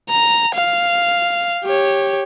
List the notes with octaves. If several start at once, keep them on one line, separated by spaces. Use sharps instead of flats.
A#5
F5
G4 C#5